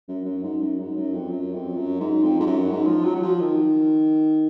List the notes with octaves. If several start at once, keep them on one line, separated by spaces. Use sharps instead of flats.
F#2
F#2
G#2
F#2
G#2
F#2
F2
F#2
F2
F#2
G#2
F2
G#2
F#2
G#2
F3
F#3
F#3
F3
D#3